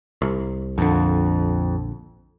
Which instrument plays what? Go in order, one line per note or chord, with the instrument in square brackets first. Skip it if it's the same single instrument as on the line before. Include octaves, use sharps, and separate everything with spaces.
[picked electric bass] C2
[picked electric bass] A#1 D3 [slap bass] F2